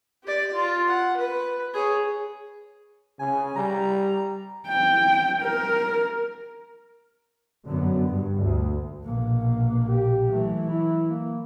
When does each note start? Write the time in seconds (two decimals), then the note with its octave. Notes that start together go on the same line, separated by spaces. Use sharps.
0.24 G4 D5
0.53 F4
0.88 F#5
1.17 B4
1.74 G#4 C#5
3.19 C#3 G#5
3.56 G3 A#5
4.68 G5
5.42 A#4
7.65 F#2 D3 F#3 B3
8.06 G2
8.40 D2
9.03 A#1 B2 A#3
9.89 G4
10.29 E3 F#3 A3
10.69 E4
11.08 A#3